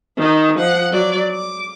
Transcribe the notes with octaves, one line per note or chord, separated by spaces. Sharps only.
D#3 D#4
F3 F#5
F#3 D5
D6